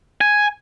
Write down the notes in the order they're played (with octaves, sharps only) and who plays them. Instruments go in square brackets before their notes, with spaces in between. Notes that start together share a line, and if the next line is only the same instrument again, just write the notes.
[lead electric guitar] G#5